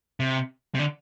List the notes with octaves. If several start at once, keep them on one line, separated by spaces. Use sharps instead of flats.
C3
C3
D3